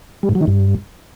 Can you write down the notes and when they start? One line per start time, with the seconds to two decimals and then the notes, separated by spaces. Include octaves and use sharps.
0.23 G3
0.29 G#2
0.35 F#3
0.41 D#3
0.47 G2